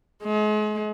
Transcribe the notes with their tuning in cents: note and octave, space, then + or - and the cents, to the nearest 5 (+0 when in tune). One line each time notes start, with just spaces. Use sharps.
G#3 +35